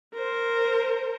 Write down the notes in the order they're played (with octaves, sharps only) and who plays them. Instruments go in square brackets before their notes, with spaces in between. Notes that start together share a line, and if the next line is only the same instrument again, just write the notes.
[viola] A#4 C5